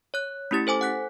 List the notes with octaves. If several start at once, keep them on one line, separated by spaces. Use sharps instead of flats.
C#5 F#6
A3 C#4 E4 G4 A6
A4 C5 G#5 D6
F#5 F#6 B6